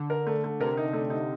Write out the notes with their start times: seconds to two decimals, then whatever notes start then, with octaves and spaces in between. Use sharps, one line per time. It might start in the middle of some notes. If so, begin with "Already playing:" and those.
Already playing: D3
0.10 A#4
0.27 A3
0.44 A3
0.60 C3 A#4
0.77 D#4
0.93 A3
1.10 D#4